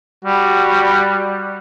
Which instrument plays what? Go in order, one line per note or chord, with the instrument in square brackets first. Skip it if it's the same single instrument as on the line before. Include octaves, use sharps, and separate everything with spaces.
[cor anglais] G3 [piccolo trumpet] F#4